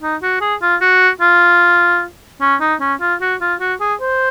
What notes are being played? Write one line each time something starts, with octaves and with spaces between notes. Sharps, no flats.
D#4
F#4
G#4
F4
F#4
F4
C#4
D#4
C#4
F4
F#4
F4
F#4
G#4
C5